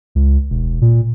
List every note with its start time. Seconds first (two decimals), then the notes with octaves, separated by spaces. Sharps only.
0.15 C#2
0.50 E1
0.82 A#2